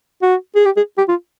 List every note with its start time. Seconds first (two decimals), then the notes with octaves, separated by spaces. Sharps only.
0.22 F#4
0.55 G#4
0.65 G4
0.77 G#4
0.98 G4
1.08 F4